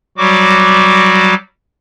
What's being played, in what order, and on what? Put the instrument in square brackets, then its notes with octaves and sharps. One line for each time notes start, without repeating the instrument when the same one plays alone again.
[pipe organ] F#3 G3 F#4 D6